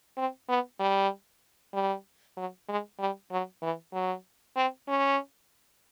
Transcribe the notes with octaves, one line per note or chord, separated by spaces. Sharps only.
C4
B3
G3
G3
F#3
G#3
G3
F#3
E3
F#3
C4
C#4